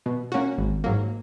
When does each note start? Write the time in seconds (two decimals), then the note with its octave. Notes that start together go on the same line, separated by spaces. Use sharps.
0.06 B2
0.32 A#3 C#4 F#4
0.58 G#1
0.84 G#2 F#3 A#3